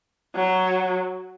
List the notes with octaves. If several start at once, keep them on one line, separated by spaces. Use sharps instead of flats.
F#3